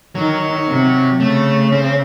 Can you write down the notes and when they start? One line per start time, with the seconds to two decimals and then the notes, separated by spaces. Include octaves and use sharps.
0.15 D#3 F#3
0.68 C3
1.20 C#3 A3
1.72 C4